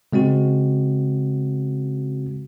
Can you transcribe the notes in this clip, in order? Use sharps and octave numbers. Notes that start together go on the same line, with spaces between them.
C#3 G#3 C4 F#4